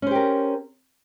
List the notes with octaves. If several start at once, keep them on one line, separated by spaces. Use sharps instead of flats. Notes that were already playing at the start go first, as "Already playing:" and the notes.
C#4 G4 A#4 C5